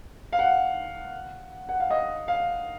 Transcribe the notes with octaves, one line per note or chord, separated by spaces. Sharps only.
F5
F#5
F#5
F5
D#5
F5